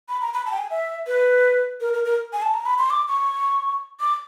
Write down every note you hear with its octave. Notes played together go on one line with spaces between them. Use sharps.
B5
A#5
B5
A5
G5
G#5
E5
B4
A#4
A#4
A#4
G#5
A5
A#5
B5
C6
D6
C#6
D6